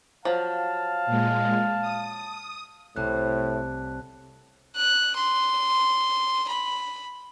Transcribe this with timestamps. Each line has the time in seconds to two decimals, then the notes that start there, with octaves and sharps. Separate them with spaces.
0.25 F3 F#3 F5 A5
1.06 A#2 G#3
1.81 D#6
2.96 C2 A2 A5 F#6
4.75 F#6
5.16 C6
6.48 B5